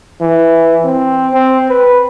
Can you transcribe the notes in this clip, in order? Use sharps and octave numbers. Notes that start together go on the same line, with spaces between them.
E3
C4
C4
B4